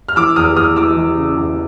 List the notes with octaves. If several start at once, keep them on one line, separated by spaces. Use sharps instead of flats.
F6
E3 D6 E6
E2 D#6 F6
E2 D#6 F6
E3 D6 E6
E3
C#3
E2